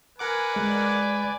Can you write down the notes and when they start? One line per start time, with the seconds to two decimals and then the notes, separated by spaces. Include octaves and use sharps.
0.19 A#4 B4 F#5 G#5 D6
0.56 G#3 D5